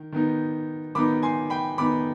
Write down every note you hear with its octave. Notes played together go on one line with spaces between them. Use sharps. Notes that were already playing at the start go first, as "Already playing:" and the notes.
Already playing: D#3
D#3 B3 D#4
D#3 B3 D#4 B5 D6
G#5 C6
G5 B5
D#3 B3 D#4 B5 D6